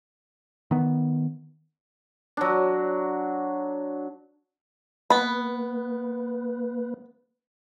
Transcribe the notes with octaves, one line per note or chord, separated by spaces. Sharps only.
D#3 B3
F#3 D4
A#3 B3 B4 B5